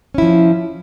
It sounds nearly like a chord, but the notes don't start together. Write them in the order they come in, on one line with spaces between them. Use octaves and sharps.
C#4 E4 F3